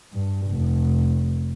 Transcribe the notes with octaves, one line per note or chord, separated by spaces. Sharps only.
G2
F1